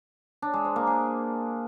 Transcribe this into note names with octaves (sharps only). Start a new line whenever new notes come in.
D4
G#3
C5
A#3
G#4